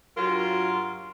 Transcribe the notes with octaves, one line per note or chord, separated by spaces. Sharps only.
G2 F#3 F4 F#4 A#4